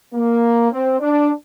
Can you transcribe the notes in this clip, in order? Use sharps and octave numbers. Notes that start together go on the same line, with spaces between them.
A#3
C4
D4